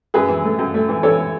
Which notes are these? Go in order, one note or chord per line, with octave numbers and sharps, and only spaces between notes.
F#2 G#4 B4
E3
A3
F#2
A3
E3
E3 A4 C#5